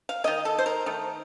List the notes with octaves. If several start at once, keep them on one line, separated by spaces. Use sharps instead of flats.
F5
D#3 A#3 D#5
A4
C5
A#4
D#3 A3